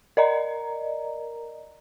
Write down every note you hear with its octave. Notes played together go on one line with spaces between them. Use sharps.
A#4 D5 D#5 A#5